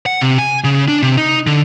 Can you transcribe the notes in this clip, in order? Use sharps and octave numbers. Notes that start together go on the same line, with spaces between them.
F#5
C3
G#5
C#3
D4
C3
D#4
D3